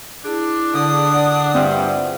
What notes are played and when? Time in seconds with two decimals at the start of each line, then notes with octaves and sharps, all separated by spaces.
0.25 D4 E4 G#4
0.74 D3 D#6
1.09 G#4 D5 F#5
1.54 G2 C4 E4 F4